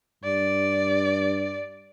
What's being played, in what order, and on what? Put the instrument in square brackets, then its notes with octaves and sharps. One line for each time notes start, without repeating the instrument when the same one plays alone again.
[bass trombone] G2 [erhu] D5